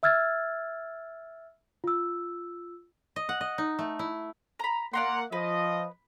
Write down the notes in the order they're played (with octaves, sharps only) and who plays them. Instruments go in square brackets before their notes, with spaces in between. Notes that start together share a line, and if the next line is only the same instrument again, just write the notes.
[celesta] E5 E6 F6 G#6 A6
F4 E6
[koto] D#5
F#5
D#5
D#4
A3
E4
[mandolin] A#5 B5
[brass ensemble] A#3 F#5 [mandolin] D5 A#5 C6
[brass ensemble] F3 D#5 [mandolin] B4